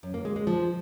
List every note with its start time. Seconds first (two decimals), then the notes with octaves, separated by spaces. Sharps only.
0.03 F#2
0.14 A#3
0.25 G#3
0.36 G#3
0.47 F3